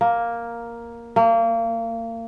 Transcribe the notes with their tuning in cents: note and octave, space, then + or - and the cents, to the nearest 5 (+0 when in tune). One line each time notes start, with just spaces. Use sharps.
A#3 +5
A#3 -30